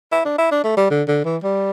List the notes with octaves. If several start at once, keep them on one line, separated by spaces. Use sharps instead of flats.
E4
D4
E4
D4
A3
G3
D3
D3
E3
G3